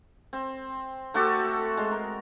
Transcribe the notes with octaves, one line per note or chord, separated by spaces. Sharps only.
C4
A3 F#4 G4 A4
G#3
A#4